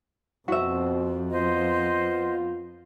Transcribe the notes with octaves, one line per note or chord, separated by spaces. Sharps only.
F2 B2 C4 F#4 E5
B3 F4 C5 D#5